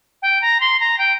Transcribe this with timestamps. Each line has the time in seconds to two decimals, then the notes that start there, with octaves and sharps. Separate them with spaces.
0.22 G5
0.42 A#5
0.61 C6
0.80 A#5
0.98 G5